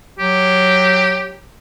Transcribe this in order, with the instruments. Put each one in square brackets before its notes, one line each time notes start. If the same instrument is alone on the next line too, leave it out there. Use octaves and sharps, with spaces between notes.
[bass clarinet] F#3 [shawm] G4